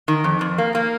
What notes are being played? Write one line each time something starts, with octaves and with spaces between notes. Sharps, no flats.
D#3
F2
F2
A#3
A#3